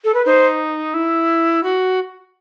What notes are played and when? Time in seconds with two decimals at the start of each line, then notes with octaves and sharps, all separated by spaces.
0.04 A4
0.14 B4
0.26 D#4 C5
0.94 E4
1.63 F#4